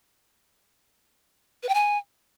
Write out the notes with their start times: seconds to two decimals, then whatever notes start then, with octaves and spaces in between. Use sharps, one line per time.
1.63 B4
1.69 G5
1.74 G#5